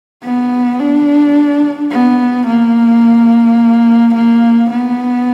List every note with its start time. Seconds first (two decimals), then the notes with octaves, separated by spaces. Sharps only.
0.23 B3
0.79 D4
1.91 B3
2.47 A#3
4.15 A#3
4.71 B3